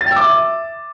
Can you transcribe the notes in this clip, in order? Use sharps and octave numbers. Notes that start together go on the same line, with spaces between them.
A6
G5
E6
D6
E5